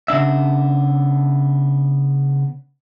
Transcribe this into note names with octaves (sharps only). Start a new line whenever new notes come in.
C#3 B3 D4 E5